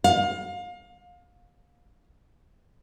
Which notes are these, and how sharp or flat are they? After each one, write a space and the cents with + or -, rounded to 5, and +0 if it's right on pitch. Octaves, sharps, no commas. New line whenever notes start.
F5 +30